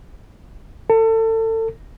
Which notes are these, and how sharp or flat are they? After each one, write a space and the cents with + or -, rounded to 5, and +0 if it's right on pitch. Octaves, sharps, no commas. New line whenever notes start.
A4 +30